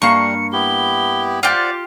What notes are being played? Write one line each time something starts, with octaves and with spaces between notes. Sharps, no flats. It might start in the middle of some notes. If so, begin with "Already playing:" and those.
G2 G3 A#3 D4 F5 C#6 C#7
B3 E4 G4 G7
F4 G4 C5 D5 F#5 D6